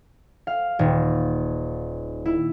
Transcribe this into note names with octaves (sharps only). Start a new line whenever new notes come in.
F5
D#1
E4